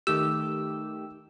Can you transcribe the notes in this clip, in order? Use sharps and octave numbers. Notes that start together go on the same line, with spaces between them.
D#3 A3 G4 E6